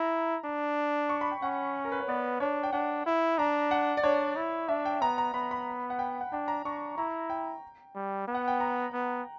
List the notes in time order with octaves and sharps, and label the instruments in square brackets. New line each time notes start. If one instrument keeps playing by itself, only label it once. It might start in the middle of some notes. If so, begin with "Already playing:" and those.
Already playing: [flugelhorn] E4 [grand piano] A#5
[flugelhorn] D4
[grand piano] C#6
B5
G5
[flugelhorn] C#4 [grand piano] F#5
[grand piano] A#4
B4
C#5
[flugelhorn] B3 [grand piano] D5
[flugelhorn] D4 [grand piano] C#5
[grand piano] G5
[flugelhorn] D4 [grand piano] F#5
[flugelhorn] E4
[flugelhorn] D4 [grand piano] A#5
[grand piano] F#5
D5
[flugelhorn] D4 [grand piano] C#5
[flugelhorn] E4
[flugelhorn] D4 [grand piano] E5
[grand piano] G5
[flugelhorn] B3 [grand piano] A#5
[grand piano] A#5
[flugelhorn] B3 [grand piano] B5
[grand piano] B5
F#5
G5
F#5
[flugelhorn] D4 [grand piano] G5
[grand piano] A#5
[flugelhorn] D4 [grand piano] C#6
[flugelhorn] E4 [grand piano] A#5
[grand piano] G5
[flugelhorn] G3
B3
[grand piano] F#5
G5
A#5
[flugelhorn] B3